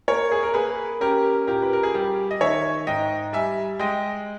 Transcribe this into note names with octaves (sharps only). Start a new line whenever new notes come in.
A#3 A#4 C#5
G#4
A#4
A#3 G#4 B4
C#4 G4 A#4
A#2 G4 A#4
B4
A#4
G#4
G3 G4
D#5
D#3 C#5 E5
G#2 D#5 G5
G3 E5 G#5
G#3 D#5 G5